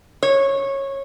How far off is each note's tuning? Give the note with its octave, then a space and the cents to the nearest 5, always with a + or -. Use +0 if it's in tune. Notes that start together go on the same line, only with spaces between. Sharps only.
C#5 -15